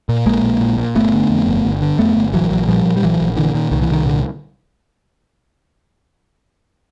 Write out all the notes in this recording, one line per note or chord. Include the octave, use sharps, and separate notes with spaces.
A#2
A#1 G#3 A#3
A#1
A#2
A#2
G1 A3 B3
D3
F2
G1
G1
D3
F2 A3 B3
G1
A#1 E3 F#3
A#1 E3 F#3
A#2 F3 G3
A#2
G3
A#1 E3 F#3
A#1
A#2 D3 E3
A#2 D#3
C2 D#3
E3
C2 D#3
A#2 D3